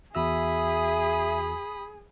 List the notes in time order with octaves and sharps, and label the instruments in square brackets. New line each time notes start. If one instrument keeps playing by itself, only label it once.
[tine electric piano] E2 F#4 E6 [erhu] G#4 [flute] E5 [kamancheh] B5 D#6